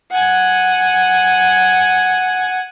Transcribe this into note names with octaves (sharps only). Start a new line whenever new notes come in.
F#5 G#5